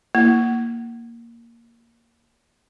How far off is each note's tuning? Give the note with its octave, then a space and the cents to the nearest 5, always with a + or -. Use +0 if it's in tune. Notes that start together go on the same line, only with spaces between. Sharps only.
A#3 +0 E4 +0